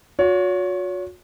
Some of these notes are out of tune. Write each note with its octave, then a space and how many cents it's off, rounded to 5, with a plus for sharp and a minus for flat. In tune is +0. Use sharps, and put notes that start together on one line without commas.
F#4 -40 C#5 +30